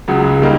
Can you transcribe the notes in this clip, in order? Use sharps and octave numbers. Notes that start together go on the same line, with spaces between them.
C#2 C#3 F#3
D#3 G3 A#3 D#4